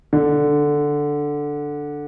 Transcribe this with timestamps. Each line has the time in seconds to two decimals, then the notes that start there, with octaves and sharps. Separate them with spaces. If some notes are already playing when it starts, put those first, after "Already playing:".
0.13 D3